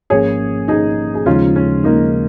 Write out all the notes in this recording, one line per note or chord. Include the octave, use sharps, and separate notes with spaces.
G#1 G#2 F3 A#3 C#4 G#4 C#5
D#4 G#4
G#4
D#2 C#3 F3 G#3 C#4 D#4 F4
C#4
A#3 D#4